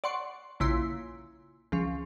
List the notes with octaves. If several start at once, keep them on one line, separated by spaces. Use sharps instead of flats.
D5 F#5 C6 C#6
A#1 C#3 E4 C6 D7
C#2 F3